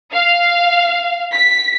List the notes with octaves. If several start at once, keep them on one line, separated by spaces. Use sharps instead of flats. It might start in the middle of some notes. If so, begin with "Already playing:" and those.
F5
B6